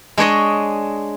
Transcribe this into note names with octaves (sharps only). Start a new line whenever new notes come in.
G#3 D4 C#5 D#5